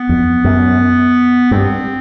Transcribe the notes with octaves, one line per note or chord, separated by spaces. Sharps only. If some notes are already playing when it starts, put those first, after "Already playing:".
Already playing: B3
F2
F#2
G2 C4